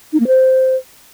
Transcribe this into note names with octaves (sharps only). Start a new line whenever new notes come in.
D#4
A#3
C5